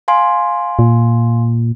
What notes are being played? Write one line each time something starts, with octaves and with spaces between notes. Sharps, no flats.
F5 G#5 C6
A#2